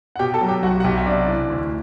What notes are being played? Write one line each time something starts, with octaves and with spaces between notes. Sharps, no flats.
F#5
B2 G4 G5
A4 A5
F#3
G4 G5
B1 F#4 F#5
F#5
B1 G4 G5
E5
C3 D4 D5
E3
D2